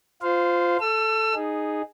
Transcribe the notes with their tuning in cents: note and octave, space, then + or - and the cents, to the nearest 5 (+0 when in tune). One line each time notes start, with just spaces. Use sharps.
F4 +0 C5 -20 F5 +0
A4 +0 E6 +35
D#4 -10 G#4 +0